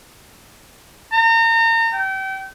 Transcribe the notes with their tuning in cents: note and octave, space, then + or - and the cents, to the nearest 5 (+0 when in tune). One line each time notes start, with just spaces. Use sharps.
A#5 -35
G5 -30